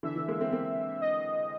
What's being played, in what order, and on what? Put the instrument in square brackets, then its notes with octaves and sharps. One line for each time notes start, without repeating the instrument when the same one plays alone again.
[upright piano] D3 E3 [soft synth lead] E5
[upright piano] D3 E3
G#3 A#3
A#3 C4
A#3 C4
[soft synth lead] D#5